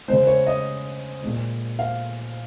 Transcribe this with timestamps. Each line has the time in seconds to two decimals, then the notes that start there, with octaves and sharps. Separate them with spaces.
0.08 C#3 G#3 C5
0.27 C#5
0.47 D#5
1.22 A#2 G#3
1.79 F5